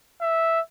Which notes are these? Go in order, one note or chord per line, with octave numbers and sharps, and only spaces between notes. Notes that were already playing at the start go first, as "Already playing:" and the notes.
E5